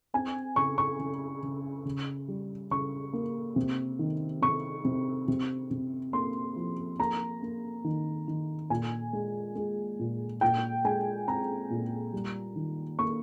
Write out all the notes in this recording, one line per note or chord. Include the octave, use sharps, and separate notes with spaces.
C4 G#5
C#3 C#6
C#6
C#3
C#3
C#3
G3
C#3 C#6
A#3
C3
D#3
C3 C#6
C3
C3
C3
A#3 C6
F3
A#3 A#5
A#3
D#3
D#3
A#2 G#5
G#3
G#3
A#2
A#2 G5
G#3 G#5
C4 A#5
A#2
G3
D#3
A#3 C#6